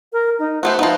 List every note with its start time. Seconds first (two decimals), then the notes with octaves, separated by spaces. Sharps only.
0.13 A#4
0.39 D#4
0.63 A3 B3 F#4 C5
0.79 F3 B3 D#4